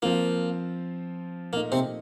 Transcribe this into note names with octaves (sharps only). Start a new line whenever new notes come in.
F3 A#3 C4 F4
A#2 A3 A#3 D#4
C3 C4